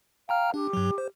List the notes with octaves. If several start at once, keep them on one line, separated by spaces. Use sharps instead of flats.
F5 G5 A#5 F6
D4 G4
G2 F#3
C5